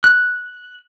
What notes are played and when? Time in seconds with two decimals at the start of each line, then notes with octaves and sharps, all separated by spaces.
0.04 F#6